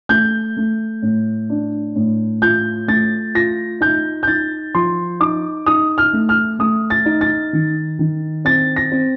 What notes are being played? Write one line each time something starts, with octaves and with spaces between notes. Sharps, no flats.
A3 G6
A3
A2
D4
A2
F4 G6
A3 A6
F4 A#6
D#4 G6
G6
D#4 A6
F3 C6
D#4 D6
D#4 D#6
F6
A3
F6
A3 D#6
A6
D#4
A6
D#3
D#3
C4 A6
A#6
C4